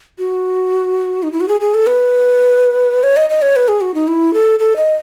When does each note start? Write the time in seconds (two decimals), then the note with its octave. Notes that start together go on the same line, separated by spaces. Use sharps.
0.19 F#4
1.23 D#4
1.32 E4
1.41 F#4
1.48 G#4
1.61 G#4
1.74 A4
1.87 B4
3.03 C#5
3.17 D#5
3.30 D#5
3.42 C#5
3.56 B4
3.68 G#4
3.81 F#4
3.94 D#4
4.08 E4
4.34 A4
4.59 A4
4.76 D#5